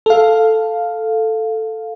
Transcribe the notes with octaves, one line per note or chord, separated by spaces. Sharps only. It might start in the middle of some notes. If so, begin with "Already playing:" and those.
A4 F5